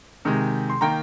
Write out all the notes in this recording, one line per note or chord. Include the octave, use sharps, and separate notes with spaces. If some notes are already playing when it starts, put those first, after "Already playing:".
C3 D#3 G#3
C6
D#3 A#3 G5 A#5